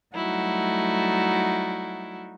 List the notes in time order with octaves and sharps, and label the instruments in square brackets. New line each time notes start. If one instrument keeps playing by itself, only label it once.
[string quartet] F#3 G3 A3 D#4 E4 F#4